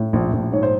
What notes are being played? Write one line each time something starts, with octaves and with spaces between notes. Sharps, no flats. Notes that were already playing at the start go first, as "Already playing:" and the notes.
Already playing: A2
A#1
A#1
G#2 C#5
C5